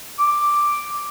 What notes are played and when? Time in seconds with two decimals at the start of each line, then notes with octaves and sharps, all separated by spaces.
0.19 D6